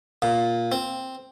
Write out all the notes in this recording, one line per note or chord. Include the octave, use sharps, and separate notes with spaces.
A#2
C4